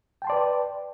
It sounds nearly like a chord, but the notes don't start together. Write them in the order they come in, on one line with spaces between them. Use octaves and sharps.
G5 A5 C6 D5 B4